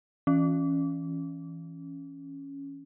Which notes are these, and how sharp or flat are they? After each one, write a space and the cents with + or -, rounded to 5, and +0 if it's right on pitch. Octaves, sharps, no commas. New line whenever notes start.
E3 +0 C#4 +0